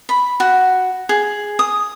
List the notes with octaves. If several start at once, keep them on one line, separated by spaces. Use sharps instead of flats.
B5
F#4
G#4
D#6